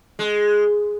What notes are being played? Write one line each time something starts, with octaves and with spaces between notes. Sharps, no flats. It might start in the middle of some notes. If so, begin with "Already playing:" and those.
G#3